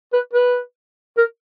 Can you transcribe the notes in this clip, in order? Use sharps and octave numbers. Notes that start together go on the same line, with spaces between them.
B4
B4
A#4